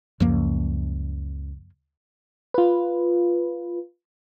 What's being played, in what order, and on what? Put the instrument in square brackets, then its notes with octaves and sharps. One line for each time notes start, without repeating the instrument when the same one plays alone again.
[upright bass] C#2 [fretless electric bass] F#2 F3 A#3
[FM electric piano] F4 B4